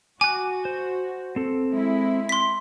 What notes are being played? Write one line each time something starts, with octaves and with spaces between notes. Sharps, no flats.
F#4 G#5 D6 F#6
C5
C4 A4
G#3 E4
C6 B6